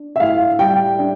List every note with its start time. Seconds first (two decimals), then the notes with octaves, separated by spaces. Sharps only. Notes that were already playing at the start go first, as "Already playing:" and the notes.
Already playing: D4
0.16 E5
0.20 A2 F5
0.59 G3 G5
0.99 D4